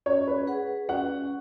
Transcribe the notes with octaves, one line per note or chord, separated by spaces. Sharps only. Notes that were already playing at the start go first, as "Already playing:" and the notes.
C#4 C#5
B4
G#4 B4 F#5
C#4 F#5